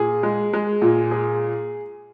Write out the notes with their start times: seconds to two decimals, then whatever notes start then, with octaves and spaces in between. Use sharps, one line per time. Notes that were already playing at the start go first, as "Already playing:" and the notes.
Already playing: A#2 G#4
0.23 G#3
0.53 G#3
0.82 A#2
1.11 G#4